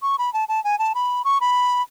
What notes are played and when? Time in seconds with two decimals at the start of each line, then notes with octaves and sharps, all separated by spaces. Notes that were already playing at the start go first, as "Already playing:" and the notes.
0.02 C#6
0.19 B5
0.33 A5
0.49 A5
0.64 G#5
0.79 A5
0.95 B5
1.25 C#6
1.41 B5